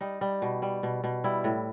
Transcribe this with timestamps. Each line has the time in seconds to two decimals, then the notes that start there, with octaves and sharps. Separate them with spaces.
0.01 G3 D#4
0.21 G3
0.42 B2
0.62 G3
0.83 B2
1.04 B2
1.24 G3 E4
1.44 A2